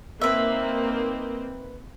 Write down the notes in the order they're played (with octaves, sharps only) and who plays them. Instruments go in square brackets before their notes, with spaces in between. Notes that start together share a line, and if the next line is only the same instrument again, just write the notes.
[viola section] A#3 C4 D#4 [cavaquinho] B4 E5